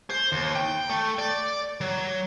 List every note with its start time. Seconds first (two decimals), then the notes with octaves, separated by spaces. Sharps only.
0.10 C5
0.32 D#2
0.55 G5
0.89 A3
1.18 D5
1.81 F#3